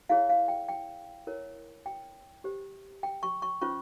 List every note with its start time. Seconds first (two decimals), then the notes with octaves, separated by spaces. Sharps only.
0.09 E4 G#4 C#5 F5
0.29 F5
0.48 G5
0.69 G5
1.27 E4 A#4 C#5
1.86 G5
2.44 G4 C5
3.03 G5
3.23 C#6
3.42 C#6
3.61 C#4 F4 C5 C#6